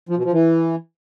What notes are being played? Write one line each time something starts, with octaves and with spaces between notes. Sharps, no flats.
F3
B2
F3
E3